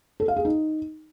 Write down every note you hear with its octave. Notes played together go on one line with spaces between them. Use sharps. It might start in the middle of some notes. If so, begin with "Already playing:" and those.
A4
F5
G#4
D#4